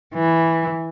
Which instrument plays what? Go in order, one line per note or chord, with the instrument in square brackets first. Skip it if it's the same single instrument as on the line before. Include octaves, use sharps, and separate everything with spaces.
[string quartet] E3